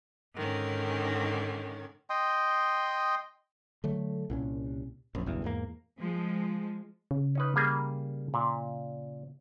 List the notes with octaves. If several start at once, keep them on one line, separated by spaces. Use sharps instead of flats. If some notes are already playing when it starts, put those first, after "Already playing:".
G#2 D3 D#3 C#4
D#5 G5 C6 D#6
D3 F#3 A3
C2 A#2 C#4
A#1 F#2
F#1 B1 E2 G2
E2 G#2 A#3
F3 G#3
C#3
C#4 D#4 B4
G3 A#3 G#4
A#2